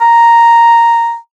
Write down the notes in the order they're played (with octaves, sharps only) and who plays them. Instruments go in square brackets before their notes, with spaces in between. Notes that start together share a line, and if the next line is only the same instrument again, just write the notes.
[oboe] A#5